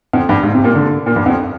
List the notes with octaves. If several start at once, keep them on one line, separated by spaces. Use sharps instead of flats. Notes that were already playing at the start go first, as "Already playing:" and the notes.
F2
G2
G#2
C3
A#2
D3
A#2
G2
F2